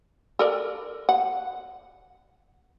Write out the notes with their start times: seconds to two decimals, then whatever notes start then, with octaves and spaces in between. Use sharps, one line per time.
0.39 A4 A#4 D5
1.09 F#5